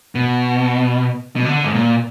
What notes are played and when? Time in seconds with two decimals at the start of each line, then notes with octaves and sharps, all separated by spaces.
0.15 B2
1.36 B2
1.45 D3
1.64 G#2
1.74 A#2